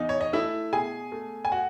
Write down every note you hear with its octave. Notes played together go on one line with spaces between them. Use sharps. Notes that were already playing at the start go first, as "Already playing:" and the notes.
Already playing: E2 D#4
C#5
D#5
A3 E4 E5
B2 G#4 G#5
A3
G#5
F#4 F#5